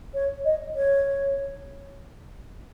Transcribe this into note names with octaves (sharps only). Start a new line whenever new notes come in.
C#5
D#5
C#5